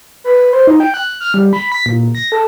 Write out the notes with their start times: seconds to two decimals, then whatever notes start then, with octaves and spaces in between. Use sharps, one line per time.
0.24 B4
0.53 C5
0.67 D#4
0.80 G5
0.94 F#6
1.21 F6
1.34 G3
1.53 B5
1.72 B6
1.86 A#2
2.15 A#6
2.32 A4